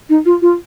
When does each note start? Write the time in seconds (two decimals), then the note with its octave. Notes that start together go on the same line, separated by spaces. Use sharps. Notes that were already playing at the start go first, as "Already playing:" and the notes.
0.09 D#4
0.25 F4
0.42 F4